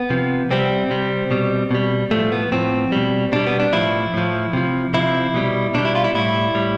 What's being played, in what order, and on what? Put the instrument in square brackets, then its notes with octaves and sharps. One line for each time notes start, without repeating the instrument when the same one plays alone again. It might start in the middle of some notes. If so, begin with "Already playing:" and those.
Already playing: [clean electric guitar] B3
C3 F3
C3 G3 C4
C3 G3
B2 G3
B2 G3
A2 F3 A3
B3
A2 F3 C4
B2 G3
B2 G3 D4
B3
D4
A2 F3 E4
A2 F3
C3 F3
C3 F3 E4
B2 G3
B2 G3 D4
E4
F4
E4
A2 G3 E4
A2 G3